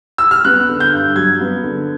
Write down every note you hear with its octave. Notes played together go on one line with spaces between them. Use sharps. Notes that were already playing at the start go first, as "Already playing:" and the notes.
E6
F6
B3 F#6
D3
G6
G2
F#3 G#6
B3
D3